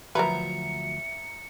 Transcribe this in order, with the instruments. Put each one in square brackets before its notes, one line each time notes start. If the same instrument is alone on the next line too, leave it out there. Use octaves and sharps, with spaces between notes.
[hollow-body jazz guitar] D2 F3 F#3 [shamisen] A#4 B4 [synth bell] E5 A#5 [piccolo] C#7